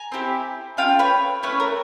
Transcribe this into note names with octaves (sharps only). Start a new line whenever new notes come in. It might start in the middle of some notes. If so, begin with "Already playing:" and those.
Already playing: G#5 A#5
C4 E4 G4
A3 C#4 F4 F5 G5
B4 C#5
A3 C#4 E4 B4 C#5
A#4